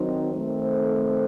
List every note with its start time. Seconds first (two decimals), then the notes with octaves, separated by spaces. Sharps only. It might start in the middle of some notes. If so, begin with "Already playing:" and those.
Already playing: D#3 F#3 C4 D#4
0.34 D#3 A3 C4
0.63 A4 C5